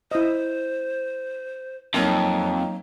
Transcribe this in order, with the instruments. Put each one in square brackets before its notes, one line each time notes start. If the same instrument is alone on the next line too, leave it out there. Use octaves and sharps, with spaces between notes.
[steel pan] E4 D#5 [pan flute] C5
[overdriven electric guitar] F2 [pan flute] F#3 [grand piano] A#3 D#4